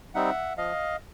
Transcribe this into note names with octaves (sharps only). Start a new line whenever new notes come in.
G3 C4 D#4 E5 F#5
F3 D#5 F5